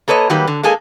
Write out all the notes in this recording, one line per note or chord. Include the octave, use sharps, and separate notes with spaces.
A#3 A4 B4 C#5 D#5
D#3 F#3 G3 A#3 G4 B4
D3
G#3 A#3 G#4 A4 G#5